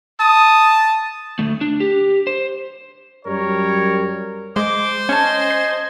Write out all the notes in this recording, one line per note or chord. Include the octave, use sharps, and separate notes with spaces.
A5 D#6
D2 A3
D4
G4
C5
F#2 G3 A#4 C#5
G#3 C5 D6
C#4 D#5 G#5 A5
C7